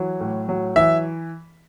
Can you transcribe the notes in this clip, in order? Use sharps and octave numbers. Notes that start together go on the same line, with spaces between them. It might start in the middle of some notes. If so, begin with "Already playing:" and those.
Already playing: E3 F#3
A2
F#3
E3 E5